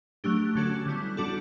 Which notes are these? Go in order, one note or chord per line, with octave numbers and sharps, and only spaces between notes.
F#3 A3 D4 G4
D3 F#3 C#4 F#4 A4
D3 G3 B3 E4
D3 G3 D4 F#4 A4